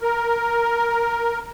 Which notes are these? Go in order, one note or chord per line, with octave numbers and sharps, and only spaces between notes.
A#4